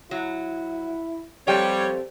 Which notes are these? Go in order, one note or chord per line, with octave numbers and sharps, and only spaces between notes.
F#3 E4
F3 G3 A3 C4 G4 C#5 D5 G5